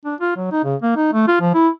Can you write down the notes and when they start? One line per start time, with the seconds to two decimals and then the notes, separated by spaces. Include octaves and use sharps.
0.05 D4
0.21 F4
0.37 F#3
0.52 D#4
0.64 C#3
0.82 A#3
0.96 D#4
1.14 A3
1.28 F4
1.41 F3
1.54 E4